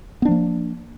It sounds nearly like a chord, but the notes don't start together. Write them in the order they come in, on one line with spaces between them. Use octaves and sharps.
B3 D4 F3 A#3